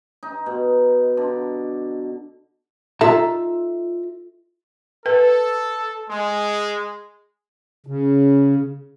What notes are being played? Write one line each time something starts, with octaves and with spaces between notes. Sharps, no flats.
D#4
B2
D3
D#4 F4 A4 E5 A#5
A4 B4
G#3
C#3